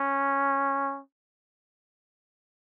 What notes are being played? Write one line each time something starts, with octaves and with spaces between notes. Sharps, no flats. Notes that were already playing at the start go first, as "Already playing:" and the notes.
Already playing: C#4